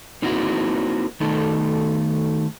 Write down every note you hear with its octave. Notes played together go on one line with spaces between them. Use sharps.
A#3 C4 D#4 E4 F#4
D#3 A3 D#4 A4